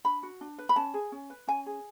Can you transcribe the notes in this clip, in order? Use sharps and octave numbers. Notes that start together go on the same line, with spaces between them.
D4 B5
F#4
D4
B4
B5
C#4 A5
G#4
C#4
B4
C#4 G#5
G#4